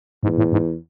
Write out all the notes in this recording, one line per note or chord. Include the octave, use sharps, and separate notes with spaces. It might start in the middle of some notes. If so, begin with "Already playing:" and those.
E2 G#2
A2
G#2